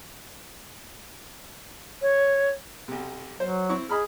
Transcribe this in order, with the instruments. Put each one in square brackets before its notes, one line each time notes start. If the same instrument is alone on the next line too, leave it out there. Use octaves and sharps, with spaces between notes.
[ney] C#5
[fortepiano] B1 C3
[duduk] F#3 [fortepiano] C5
[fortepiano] C4 E4 C#6
[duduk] G#4 [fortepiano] D#5 B5 F6